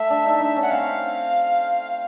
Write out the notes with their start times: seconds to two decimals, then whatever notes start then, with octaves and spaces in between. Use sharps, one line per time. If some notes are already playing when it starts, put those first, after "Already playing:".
Already playing: A3 E5
0.10 D4
0.25 D#4
0.40 D4
0.56 C#4
0.62 F#5
0.71 C4 F5